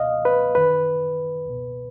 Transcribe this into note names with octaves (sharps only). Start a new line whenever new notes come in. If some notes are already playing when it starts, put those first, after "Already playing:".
Already playing: C#2 B2 D#5 F5
B4
F#2 D#3 B4
C#2 B2